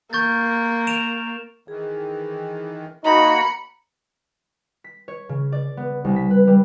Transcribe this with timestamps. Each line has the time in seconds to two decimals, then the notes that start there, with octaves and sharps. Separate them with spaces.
0.13 A#3 C#6 G6 A6
0.87 D7 E7 F7
1.68 D#3 E3 G#4
3.04 A#3 D#4 F#4 A#5 B5 C#7
4.84 B6
5.08 C#5
5.29 C#3
5.52 D5
5.77 B3
6.04 C2
6.16 B6
6.31 B4
6.47 G3